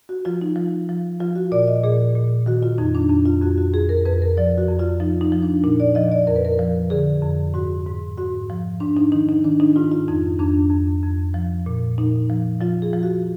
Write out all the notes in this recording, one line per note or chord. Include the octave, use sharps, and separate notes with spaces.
F#4
F3 F4
D#4
F3
F3
F3 F4
F#4
A#2 D5
D#5
A#2 G#4
A#2
D#3 F#4
F4
F2 D#4
D4
F2
F4
F2 F#4
F#4
F2 G#4
A#4
F2 B4
A#4
F3 D5
F#4
F2
F4
F3 D#4
D#4
F3
D4
A#2 D#4
D5
F3 D#5
D5
F2 A#4
B4
A#4
F3
D3 G#4
F2
G#2 F#4
G#2
G#2 F#4
F3
G#2 D4
D#4
D#3 D#4
D#4
D#3 D4
D#4
G#2 F4
F4
F2 D#4
F2 D4
F2
F2
F3
A#2
A#2 D#4
F3
F3 F4
G#4
F3
F#4